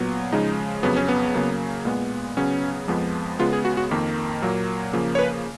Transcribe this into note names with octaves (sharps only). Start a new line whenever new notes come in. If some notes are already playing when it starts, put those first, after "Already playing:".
Already playing: A#2 F#3 B3
C#3 F3 G#3 D#4
F2 C#3 F#3 B3
C#4
B3
C#3 F#3 A#3
A#2 G#3 B3
C#3 F#3 B3 C#4
F2 F3 G#3 B3
C#3 G#3 B3 F4
G#4
F#4
F#4
F2 D#3 A#3
A#2 F#3 A#3
C#3 F3 A#3
C#5
B4